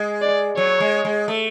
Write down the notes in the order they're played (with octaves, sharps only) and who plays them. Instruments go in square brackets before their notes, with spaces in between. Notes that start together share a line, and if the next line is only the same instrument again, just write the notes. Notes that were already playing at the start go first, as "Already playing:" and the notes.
Already playing: [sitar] G#3
[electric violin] D5
[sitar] F#3 [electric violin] C#5
[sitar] G#3
G#3
A3